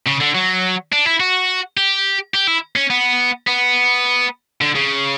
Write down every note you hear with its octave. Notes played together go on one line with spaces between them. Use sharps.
C#3
D3
F#3
D4
E4
F#4
G4
G4
E4
C#4
B3
B3
D3
C#3